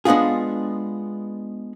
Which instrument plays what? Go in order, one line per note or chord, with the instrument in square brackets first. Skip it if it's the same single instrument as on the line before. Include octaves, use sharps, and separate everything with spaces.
[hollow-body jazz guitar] G#3 B3 D4 F4 G#4